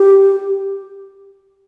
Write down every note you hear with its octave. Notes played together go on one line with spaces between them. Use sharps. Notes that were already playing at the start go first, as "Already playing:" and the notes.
Already playing: G4